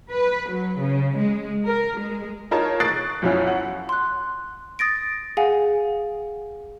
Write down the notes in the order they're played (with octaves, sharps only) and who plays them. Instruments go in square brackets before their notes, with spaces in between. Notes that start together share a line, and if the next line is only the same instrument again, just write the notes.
[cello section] B4
F#3
C#3
G#3
A#4
G#3
[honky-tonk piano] D#4 F4 A#4 C#5 A5
C#6 D#6 F#6 A6 C7 D7
B1 F#2 F3 F#3 C#4 E4
F#5
[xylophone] C6 F#6
D#6 A6 A#6 D7
G#4 F5 F#5 G#5